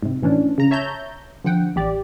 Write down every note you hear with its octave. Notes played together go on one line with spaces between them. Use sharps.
G#2 C3
A2 E3 C#4 D4
C#3 A#5
C#5 E5 A5 A#5 G6
D3 F3 F#5 G5
A1 G4 D5